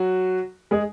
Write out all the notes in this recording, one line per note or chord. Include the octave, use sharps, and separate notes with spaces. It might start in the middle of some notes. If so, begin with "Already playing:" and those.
Already playing: F#3 F#4
G#3 G#4